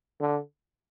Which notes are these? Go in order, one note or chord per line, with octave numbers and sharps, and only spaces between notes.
D3